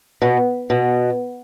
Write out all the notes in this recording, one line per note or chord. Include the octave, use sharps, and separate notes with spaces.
B2
B2